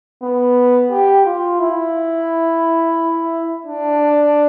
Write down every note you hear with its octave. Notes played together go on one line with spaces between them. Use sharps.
B3
G4
F4
E4
D4